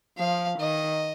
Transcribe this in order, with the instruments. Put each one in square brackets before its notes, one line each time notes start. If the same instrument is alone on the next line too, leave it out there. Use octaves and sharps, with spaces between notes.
[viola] F3 [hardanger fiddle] F5
[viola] D#3 [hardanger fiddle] D#5